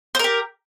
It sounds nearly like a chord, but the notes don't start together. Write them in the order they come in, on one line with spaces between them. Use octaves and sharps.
C5 A#4 G4